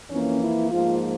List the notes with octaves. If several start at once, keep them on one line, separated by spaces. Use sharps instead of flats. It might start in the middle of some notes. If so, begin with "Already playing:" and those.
F2 E3 A#3 C#4
E4
G#2 F3 A#3 F4